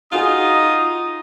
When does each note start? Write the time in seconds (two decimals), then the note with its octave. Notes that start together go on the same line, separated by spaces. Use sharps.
0.12 D#4 F4 F#4 G#4 D#6